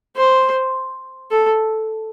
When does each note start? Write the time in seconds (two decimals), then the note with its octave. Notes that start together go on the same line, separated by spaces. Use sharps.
0.16 C5
1.31 A4